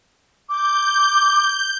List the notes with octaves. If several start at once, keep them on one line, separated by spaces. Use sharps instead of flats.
D6 G6